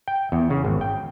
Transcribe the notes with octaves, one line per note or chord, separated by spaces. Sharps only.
G5
E2
C#3
G#1
G5